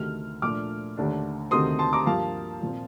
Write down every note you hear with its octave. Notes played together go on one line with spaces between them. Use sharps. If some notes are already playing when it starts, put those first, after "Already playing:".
Already playing: D2 C3 D#3 A3 F6
A#2 F3 A3 D4 D6 F6
D#2 D3 A3 D4
D2 C3 D#3 A3 C4 C6 D#6
A5 C6
A#5 D6
G2 F3 A#3 F5 A5
A#2 F3 C4